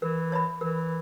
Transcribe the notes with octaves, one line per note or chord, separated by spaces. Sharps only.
E3 A#4
C#5 E5 B5
E3 A#4